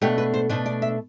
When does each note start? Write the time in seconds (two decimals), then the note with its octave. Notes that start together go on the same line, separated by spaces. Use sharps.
0.01 B2 A3 D4 G4
0.18 B4
0.34 C5
0.49 B2 A3 D4 C5
0.66 D5
0.82 E5